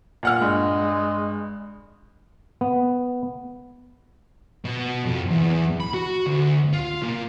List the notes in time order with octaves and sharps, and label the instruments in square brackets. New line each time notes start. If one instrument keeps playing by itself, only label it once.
[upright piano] A#2 F#5 F6
[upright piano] G2 [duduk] G#3
[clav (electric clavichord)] B3
[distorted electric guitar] B2
F2
E2
B5
F#4
D2
F4
A#2